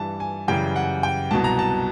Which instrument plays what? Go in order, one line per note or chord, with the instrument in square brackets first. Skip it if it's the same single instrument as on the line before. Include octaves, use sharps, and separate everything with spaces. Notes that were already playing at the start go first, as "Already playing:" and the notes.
Already playing: [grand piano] G2 E3 G3 A5
G#5
F#2 C#3 E3 G3 G5
F#5
G5
C2 B2 F#3 A5
A#5
A5